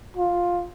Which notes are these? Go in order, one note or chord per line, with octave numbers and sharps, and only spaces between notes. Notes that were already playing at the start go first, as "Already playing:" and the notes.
F4